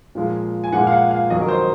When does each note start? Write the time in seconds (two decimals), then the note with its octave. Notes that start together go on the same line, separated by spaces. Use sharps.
0.15 A#2 F3 G#3
0.64 G#5
0.72 A#2 F3 G#3 F#5
0.87 F5
0.92 F#5
1.11 F5
1.30 F2 D#3 F#3 D#5
1.41 A#4
1.48 C5